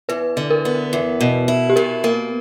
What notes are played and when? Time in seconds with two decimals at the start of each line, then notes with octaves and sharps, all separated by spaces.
0.09 E2 B4
0.37 D3
0.50 A#4
0.65 B3
0.93 E2
1.21 B2
1.48 E4
1.70 G4
1.76 B2 A#4
2.04 A#3 A#4